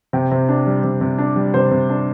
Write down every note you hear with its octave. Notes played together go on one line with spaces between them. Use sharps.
C3 G5
C3
D4
G3
C3
C3
D4
G3
C3 C5
C3
D4